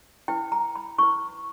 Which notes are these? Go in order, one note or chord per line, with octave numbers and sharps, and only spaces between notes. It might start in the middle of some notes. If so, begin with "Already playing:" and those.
E4 B4 G5
A#5
B5
E4 B4 C#6